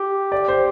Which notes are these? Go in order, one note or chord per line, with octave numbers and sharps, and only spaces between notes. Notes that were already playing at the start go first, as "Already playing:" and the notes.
Already playing: G4
D5
C5